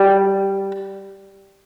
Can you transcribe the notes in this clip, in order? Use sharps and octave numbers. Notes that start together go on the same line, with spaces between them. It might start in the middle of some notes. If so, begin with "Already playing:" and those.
Already playing: G3